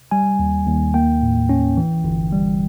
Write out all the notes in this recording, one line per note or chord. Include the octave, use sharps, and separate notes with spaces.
G3 G#5
D#2
D#2
A#3 G5
A2
C#4
E3
G1
G3